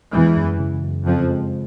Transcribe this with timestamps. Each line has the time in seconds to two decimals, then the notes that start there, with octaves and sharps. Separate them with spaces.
0.13 E2 E3 G#3
0.37 F#2
0.59 C#3
0.83 F#2
1.05 F2 C#3 F3
1.29 G#3